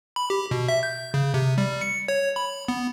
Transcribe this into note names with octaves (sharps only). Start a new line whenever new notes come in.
B5
G4
B2
E5
G6
C#3
C3
G3
C#7
C#5
B5
B3